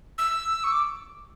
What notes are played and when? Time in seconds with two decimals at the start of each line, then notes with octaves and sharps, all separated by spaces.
0.18 E6
0.64 C#6
0.71 D6